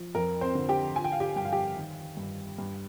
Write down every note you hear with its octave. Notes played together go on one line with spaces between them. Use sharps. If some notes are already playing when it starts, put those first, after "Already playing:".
Already playing: F3
F2 A#4
C4 C5
D3
G4 G5
F3 G#5
G5
F5
G4 G5
G2 G5
F5
G4 G5
D#3
G2
G2